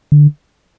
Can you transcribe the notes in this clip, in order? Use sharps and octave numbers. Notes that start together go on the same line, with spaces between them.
D3